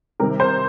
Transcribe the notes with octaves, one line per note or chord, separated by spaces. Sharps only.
C3 D#3 G3 A#4
C5